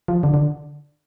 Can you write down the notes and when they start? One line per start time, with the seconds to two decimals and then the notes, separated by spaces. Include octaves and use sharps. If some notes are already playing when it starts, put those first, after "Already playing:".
0.08 F3
0.23 D3
0.34 D3